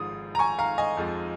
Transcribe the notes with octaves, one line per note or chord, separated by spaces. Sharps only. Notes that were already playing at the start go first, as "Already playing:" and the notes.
Already playing: G#1 G#2 F3 G#3 D#6
A#5
G#5 C#6
F5 A#5
D#5 G#5
F2 F3 G#3